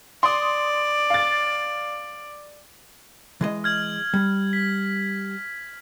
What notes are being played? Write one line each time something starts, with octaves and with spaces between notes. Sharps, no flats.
D5 C6 D#6
F5 A6
E3 G#3 D#5
F6 G#6 F#7
G3
B6